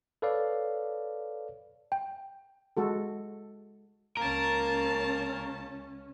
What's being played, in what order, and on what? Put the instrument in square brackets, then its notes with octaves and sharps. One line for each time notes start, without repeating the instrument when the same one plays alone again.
[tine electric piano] A4 B4 C#5 D5 F5
[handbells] G5
[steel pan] G#3 F#4 A4
[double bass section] C#2 C#4 [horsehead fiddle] A#3 A5 [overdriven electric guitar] A#4